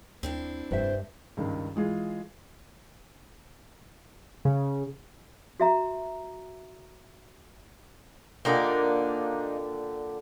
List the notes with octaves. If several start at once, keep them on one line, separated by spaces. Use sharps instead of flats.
D#2 C4 D4 E4
F1 G2 C5 E5
C#2 G2 D#3
E3 G#3 F4 G#4
C#3
F#4 E5 A#5
A#2 D3 A#3 D4 D#4 G4